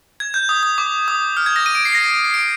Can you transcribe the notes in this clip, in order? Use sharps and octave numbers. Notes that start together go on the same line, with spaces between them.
G#6
G6
D#6
D#6
D6
D#6
F6
G#6
A#6
D#7
D7
C7
A#6
C7
D7